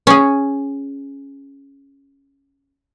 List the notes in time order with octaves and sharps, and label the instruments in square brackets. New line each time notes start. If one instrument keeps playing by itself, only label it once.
[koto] C#4 G#4